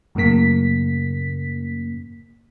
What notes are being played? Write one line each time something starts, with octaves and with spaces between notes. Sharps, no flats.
F#2 A2 C#3 A#3 B6